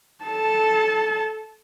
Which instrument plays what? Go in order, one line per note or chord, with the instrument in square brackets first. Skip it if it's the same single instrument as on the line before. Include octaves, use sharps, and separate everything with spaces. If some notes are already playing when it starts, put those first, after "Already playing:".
[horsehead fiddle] A4 A5